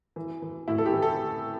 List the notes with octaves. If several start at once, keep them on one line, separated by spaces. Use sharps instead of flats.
E3
E3
A2 E4
A4
G4
E3
A4